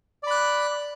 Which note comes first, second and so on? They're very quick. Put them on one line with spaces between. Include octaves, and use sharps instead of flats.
D5 B5 F#6